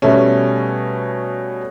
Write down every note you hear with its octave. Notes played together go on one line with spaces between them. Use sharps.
B2 G3 A3 C#4